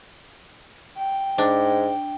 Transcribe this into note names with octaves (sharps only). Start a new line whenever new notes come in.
G5
G#2 D4